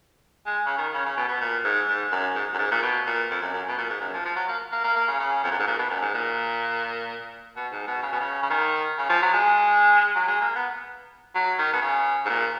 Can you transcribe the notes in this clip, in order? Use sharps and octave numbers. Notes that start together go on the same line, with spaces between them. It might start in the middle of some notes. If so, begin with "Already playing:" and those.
G#3
C#3
D#3
C#3
C#3
B2
B2
A#2
G#2
G#2
F#2
G#2
F#2
G#2
A#2
B2
A#2
F2
F#2
F#2
B2
A#2
G#2
F#2
F3
F3
F#3
A#3
A#3
A#3
A#3
C#3
C#3
F2
F#2
G#2
A#2
B2
F#2
G#2
A#2
B2
G#2
B2
C#3
B2
C#3
C#3
D#3
C#3
F3
F#3
G#3
F#3
G#3
A#3
B3
F#3
D#3
B2
C#3
G#2
A#2